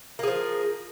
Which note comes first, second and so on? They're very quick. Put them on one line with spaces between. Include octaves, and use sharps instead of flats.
A#3 G#4 F3